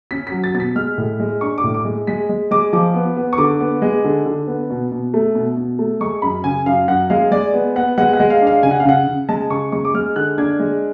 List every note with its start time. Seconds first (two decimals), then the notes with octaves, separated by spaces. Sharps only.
0.11 C#4 B6
0.27 F#3 B6
0.44 A6
0.54 B2 A6
0.60 B6
0.76 G#3 F6
0.98 A2
1.20 G#3
1.41 D4 C#6
1.58 D6
1.63 A2
1.74 D6
1.85 G#3
2.07 G#3 B6
2.29 G#3
2.51 G#3 D6
2.73 F3 D6
2.95 B3
3.16 B3
3.33 C#6
3.38 D3 D6
3.60 B3
3.82 G#3
4.05 D3
4.26 D3
4.47 B3
4.70 B2
4.91 B2
5.14 A3
5.35 B2
5.57 B2
5.79 A3
6.01 G#3 C#6
6.22 F#2 B5
6.44 C#3 G#5
6.66 F#2 F5
6.88 F#2 F#5
7.10 G#3 F5
7.31 G#3 D5
7.54 B3
7.76 B3 F#5
7.98 G#3 F#5
8.13 F#5
8.20 G#3
8.30 F5
8.41 D4
8.47 F5
8.63 C#3 G#5
8.71 F#5
8.80 F5
8.85 C#3 F#5
9.07 C#3
9.29 G#3 A5
9.50 C#3 C#6
9.72 G#3 C#6
9.85 D6
9.94 G#3 F6
10.16 D3 F#6
10.38 D4 G#6
10.60 G#3